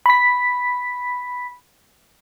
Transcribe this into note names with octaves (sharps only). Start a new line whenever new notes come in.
B5 B6